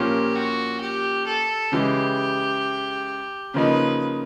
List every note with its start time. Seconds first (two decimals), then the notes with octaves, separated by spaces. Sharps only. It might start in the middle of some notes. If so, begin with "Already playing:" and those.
Already playing: A#2 F3 A#3 C#4 G4
0.35 F#4
0.81 G4
1.27 A4
1.72 C#3 E3 G#3 G4
3.54 C#3 F3 A#3 D#4 B4